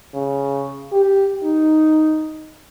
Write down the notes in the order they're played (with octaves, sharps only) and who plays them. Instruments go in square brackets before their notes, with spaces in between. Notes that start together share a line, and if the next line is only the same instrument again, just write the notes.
[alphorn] C#3
G4
D#4